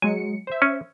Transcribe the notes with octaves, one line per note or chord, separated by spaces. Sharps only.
F#3 G#3 G#5 C#7
C5 E5
C#4